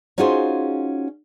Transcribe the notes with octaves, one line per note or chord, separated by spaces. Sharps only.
C#4 D#4 F4 F#4 G#4 C5